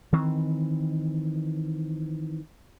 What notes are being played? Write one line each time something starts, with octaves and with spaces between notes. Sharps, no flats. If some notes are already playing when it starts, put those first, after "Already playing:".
D#3 E3 C4